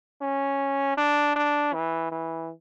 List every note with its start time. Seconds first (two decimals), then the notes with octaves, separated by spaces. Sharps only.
0.21 C#4
0.97 D4
1.36 D4
1.74 E3
2.11 E3